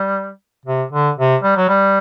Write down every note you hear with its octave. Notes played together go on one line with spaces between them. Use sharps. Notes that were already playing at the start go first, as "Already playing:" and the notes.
Already playing: G3
C3
D3
C3
G3
F#3
G3